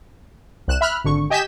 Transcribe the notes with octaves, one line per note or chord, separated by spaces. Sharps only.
C2 F#6 E7
E5 B5 F6 F#6
G#1 D3 C#6
G4 D#5 G#5 G6 B6 E7